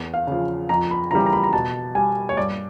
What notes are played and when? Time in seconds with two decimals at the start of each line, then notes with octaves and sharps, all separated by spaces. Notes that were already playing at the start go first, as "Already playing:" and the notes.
Already playing: E2
0.14 F5
0.27 C#3 F3
0.69 F2 A#5
0.91 B5
1.11 C#3 E3 G3 A#5
1.26 A#5
1.33 B5
1.43 A#5
1.53 B2 A5
1.95 G3 G#5
2.29 C#5
2.37 G2 D5